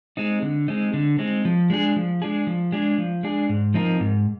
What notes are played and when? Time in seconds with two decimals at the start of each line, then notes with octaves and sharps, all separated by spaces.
0.17 G#3 C4 D#4
0.42 D3
0.68 G#3 C4 D#4
0.94 D3
1.19 G#3 C4 D#4
1.45 F3
1.70 G#3 D4 G#4
1.96 F3
2.22 G#3 D4 G#4
2.47 F3
2.72 G#3 D4 G#4
2.98 F3
3.23 G#3 D4 G#4
3.49 G#2
3.74 F3 C4 D#4 A#4
4.00 G#2